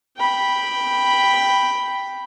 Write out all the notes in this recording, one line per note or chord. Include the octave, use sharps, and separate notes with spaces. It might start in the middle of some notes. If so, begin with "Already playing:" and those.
G5 B5